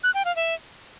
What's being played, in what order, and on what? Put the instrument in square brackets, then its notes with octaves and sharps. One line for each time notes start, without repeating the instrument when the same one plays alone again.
[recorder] F#6
G5
F5
E5